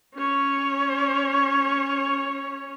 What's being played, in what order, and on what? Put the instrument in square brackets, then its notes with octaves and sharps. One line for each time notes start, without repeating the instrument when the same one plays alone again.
[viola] C#4 C#5